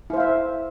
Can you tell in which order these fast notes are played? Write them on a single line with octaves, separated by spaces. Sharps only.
E4 C5 F5 E5